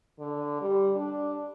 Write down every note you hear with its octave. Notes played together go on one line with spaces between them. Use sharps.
D3
G3
D4